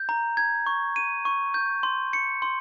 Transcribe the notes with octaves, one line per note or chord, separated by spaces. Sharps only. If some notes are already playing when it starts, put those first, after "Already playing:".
Already playing: G6
A#5
G#6
C#6
D#7
C#6
G6
C6
C#7
C6